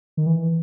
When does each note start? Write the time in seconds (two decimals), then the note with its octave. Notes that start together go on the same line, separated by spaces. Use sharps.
0.17 D#3
0.26 E3